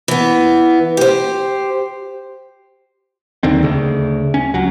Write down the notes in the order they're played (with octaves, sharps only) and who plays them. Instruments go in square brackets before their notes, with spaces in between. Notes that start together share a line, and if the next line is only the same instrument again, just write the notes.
[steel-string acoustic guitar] E3 B3
G4 C5
[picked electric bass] D#2 D3 D#3 C4
D2 C#3
C#4
C#2 F#3